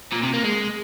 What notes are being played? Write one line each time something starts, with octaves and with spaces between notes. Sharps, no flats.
A#2
C3
A#3
G#3